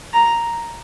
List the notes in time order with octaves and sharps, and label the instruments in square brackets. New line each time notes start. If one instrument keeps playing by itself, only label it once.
[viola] A#5